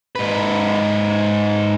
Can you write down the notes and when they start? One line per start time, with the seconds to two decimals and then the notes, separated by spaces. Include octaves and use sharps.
0.15 G#2 B4